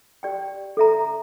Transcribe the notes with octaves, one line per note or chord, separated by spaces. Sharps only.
G4 D5 G5
A4 E5 A#5